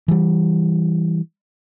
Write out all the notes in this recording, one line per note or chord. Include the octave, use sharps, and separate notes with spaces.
E3 G3